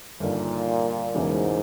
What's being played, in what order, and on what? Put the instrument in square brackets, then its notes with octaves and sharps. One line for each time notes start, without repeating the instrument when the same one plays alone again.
[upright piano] G1 G2 D#3 [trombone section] A#2
[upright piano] E1 E2 C#3 E3 A#3 [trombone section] G#2